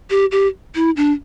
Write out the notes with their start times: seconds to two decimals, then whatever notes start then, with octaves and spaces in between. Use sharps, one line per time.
0.10 G4
0.32 G4
0.75 E4
0.97 D4